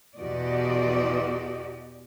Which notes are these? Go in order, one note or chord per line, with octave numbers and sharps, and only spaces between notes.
E2 B2 F#4 G4 D5 D#5